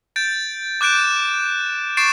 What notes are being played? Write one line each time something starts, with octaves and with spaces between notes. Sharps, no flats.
G6 A6 D7
D6 F#6 G6 D7 E7
C#6 A6 C7 D7 E7